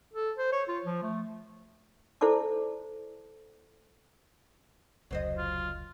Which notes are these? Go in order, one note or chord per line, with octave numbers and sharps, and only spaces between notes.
A4
C5
C#5
F4
F3
A3
E4 A4 C5 D5 A5 D6
F1 C#2 F#3 C5 D#5
F4